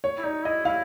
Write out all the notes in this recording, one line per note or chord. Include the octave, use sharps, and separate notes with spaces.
C#5
E4
D#4 D5
E4 D#5
E4 F5